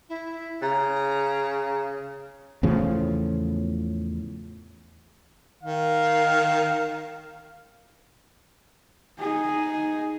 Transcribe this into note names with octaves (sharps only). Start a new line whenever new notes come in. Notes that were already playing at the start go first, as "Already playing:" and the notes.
E4
C#3 A#5
E2 A2 C#3 F3
D#3 F5
D#4 G#4